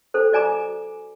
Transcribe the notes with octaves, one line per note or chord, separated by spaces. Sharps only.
D4 A4 C5
F#4 D5 G#5 A#5 D6